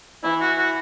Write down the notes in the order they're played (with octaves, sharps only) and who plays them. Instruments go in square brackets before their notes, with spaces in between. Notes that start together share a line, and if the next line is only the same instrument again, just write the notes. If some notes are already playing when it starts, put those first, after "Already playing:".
[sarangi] E3 [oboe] E4
[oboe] F#4
F#4